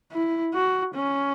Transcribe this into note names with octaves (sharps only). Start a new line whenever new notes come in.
E4
F#4
C#4